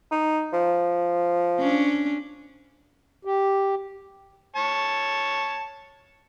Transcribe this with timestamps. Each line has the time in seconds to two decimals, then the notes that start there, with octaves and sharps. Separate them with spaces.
0.11 D#4
0.53 F3
1.59 C#4 D4
3.25 G4
4.56 C#5 A5